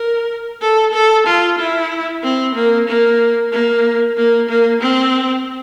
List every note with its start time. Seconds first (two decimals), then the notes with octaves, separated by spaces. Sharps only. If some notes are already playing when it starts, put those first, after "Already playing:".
Already playing: A#4
0.61 A4
0.94 A4
1.27 F4
1.58 E4
2.23 C4
2.55 A#3
2.88 A#3
3.52 A#3
4.17 A#3
4.49 A#3
4.82 C4